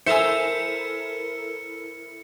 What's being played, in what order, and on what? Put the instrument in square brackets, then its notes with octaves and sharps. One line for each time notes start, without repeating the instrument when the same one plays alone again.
[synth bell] E4 A4 A#4 [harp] C5 E6 [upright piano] E5 G#5 [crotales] C#7